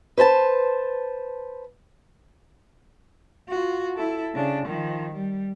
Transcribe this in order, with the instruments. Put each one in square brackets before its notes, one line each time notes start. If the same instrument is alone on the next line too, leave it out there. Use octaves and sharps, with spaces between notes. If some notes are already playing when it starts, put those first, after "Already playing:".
[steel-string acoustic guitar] B4 C5 G#5 A5
[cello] F4 F#4
E4 A4
C#3 D4
D#3 F3
G3